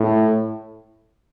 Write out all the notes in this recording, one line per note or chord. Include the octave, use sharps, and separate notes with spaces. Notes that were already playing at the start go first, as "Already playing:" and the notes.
Already playing: A2